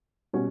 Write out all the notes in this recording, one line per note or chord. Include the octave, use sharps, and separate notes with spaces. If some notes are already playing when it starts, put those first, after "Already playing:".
B2 G3 C#4 F#4